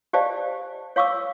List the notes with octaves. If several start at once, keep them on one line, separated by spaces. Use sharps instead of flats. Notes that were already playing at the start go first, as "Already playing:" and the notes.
G4 C5 D5 D#5 F5 A5
C#5 F5 C#6 D6 E6